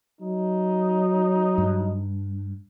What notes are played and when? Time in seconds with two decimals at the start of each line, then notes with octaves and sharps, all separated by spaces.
0.21 F#3 D#4
1.58 G2